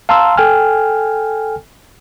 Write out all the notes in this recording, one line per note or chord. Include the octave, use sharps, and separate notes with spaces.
F5 A5 A#5 C6 E6
A4 G5 G#5 F6